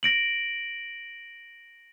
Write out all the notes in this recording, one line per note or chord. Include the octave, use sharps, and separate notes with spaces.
A#6 D7 F#7